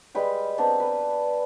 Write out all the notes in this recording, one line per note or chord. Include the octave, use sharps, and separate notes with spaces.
G3 G#3 B4 G5
B3 C4 D4 A#5
B4